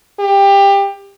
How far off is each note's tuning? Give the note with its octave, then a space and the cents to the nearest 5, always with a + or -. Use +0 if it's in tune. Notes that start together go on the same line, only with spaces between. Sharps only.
G4 +20